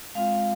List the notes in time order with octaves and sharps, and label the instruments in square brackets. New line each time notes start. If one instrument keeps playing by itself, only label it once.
[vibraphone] G#3 C4 F4 F5